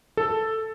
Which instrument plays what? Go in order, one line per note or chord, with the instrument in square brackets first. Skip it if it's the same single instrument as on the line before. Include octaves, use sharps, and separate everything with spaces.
[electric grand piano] A4